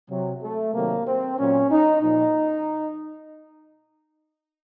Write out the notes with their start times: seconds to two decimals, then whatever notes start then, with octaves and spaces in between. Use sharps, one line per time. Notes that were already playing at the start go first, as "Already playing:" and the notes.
0.10 C3 F#3
0.43 A3
0.74 C3 D#3 F#3 A#3
1.07 C4
1.39 A#2 F#3 C#4
1.71 D#4
2.03 A#2 F3 D#4